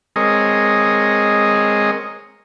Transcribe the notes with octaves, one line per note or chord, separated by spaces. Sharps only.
G#3 C4 G#4 A#4 C#5 D#5